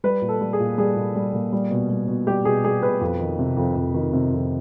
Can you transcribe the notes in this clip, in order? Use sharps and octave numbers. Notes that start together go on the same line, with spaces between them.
G3 B4
A#2
A4
G3
G#4
A#2
G3 G#4
A#2
G3
A#2
G3
B2
G3
B2
G3 G4
B2 G#4
G3 G#4
B2 B4
F2
D#3
C3
F2
F2
D#3
C3
F2